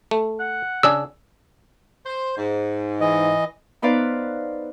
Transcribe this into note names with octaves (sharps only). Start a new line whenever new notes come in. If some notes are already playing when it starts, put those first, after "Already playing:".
A3
F#5
C#3 D4 G#4 E6
C5
G#2
E3 D#5
B3 D#4 B4 C5 D5 F5